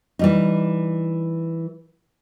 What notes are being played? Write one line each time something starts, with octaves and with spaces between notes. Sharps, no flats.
E3 G3 D#4